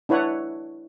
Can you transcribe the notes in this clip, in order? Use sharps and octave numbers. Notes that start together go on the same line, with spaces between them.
D4 E4 B4 C#5 F#5